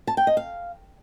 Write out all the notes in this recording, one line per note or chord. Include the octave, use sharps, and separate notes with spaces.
A5
G5
D#5
F5